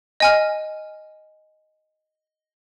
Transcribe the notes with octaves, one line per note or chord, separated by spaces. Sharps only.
D#5 G#5 F6